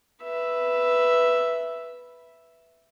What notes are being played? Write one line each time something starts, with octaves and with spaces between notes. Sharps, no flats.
B4 E5